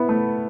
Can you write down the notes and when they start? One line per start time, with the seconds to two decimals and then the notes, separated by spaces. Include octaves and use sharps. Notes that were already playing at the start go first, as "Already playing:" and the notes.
Already playing: B3 E4
0.09 A3